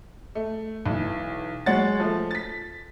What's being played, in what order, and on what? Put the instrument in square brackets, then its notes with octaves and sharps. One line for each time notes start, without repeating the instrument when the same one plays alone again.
[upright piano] A3
B1 E3
F#3 G#3 C#5 F#5 A6
F3 A3
A6 B6